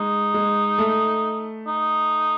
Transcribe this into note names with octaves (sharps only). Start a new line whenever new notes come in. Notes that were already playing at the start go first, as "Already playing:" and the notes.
Already playing: G#3 D#4
G#3
A3
D#4